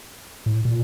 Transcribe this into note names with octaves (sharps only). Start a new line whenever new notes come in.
A2
A#2